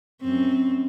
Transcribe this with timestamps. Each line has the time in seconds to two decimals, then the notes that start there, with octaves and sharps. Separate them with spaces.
0.22 F#2 C4